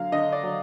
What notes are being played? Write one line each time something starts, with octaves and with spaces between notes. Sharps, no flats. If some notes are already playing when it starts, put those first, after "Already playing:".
Already playing: D3 F#3 F5
D3 D#5
D5
F#3